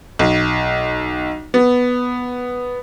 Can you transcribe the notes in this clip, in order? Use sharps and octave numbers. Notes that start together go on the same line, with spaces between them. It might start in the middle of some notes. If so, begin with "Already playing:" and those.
B1
B3